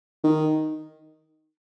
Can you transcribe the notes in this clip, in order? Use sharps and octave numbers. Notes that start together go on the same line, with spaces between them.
D#3